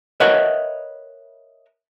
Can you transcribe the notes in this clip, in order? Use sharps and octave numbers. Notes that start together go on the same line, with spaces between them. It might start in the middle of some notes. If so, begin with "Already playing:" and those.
A#4 B4 C#5 D#5 E5 F#5